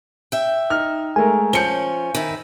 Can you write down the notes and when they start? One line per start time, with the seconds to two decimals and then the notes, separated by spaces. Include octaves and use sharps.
0.32 E5 G5
0.70 D#4 F6
1.16 G#3 A3 A#4 G#5
1.53 F3 C#4 G6 C#7 G7
2.15 D#3 E4